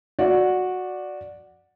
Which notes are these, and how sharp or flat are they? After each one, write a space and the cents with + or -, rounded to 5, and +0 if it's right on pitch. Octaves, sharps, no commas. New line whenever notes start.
F#4 -10 D5 +0